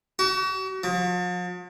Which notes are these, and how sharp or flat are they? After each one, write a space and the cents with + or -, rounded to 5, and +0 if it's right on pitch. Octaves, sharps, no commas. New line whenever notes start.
F#4 +40
F3 +45